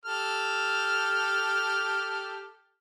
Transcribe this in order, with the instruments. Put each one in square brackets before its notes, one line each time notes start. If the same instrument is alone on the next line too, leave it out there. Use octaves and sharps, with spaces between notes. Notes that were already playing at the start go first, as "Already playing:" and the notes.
[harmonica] G4 A4 F6